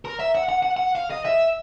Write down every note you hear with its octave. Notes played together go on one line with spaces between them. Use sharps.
A#4
E5
F#5
F#5
F#5
F#5
F5
D#5
E5